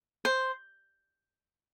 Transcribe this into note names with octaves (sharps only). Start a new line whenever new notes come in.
C5